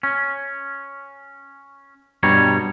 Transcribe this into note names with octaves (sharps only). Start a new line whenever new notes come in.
C#4
G2 B2 G3 C#5 A#5